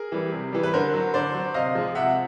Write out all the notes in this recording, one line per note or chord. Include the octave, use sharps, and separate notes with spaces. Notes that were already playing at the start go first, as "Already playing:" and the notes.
Already playing: G#4 A#4
E3 G3
C3
E3 G3
B4
D3 A#4 C5
F#3
D3 C5 D5
F#3
C3 D#5 F5
F3 G#3
C3 E5 F#5